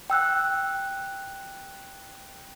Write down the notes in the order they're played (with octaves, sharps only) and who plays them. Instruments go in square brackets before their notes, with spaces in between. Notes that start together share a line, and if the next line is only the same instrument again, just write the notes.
[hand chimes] G5 E6 F#6